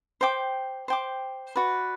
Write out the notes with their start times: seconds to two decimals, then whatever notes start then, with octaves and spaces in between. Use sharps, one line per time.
0.21 C5 G5 D6
0.88 C5 G5 D6
1.56 F#4 B4 D5